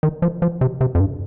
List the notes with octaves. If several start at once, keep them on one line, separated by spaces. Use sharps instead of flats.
D#3
F3
F3
C3
C3
F2
G2